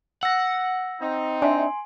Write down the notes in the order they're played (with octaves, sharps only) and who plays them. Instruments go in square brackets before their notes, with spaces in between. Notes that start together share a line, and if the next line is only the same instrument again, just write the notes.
[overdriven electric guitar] F#5 [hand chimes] E6 A#6
[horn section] C4 D#4
[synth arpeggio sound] D4 E5 [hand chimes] G#5 C6